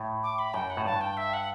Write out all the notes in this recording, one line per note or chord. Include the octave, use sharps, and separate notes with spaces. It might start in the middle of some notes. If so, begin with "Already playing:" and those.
Already playing: A2
D6
B5
F#2 G5
F#5
A2
G2 A5
G5
E5
F#5